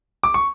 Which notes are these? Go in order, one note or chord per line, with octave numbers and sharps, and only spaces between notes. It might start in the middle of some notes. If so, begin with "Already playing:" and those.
D6
C#6